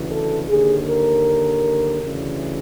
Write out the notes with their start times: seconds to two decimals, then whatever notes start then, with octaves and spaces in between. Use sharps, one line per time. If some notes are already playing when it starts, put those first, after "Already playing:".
Already playing: D2 C#3 E3
0.11 A4
0.49 D#2 D3 G#4
0.88 A#4
2.03 D2 C#3 E3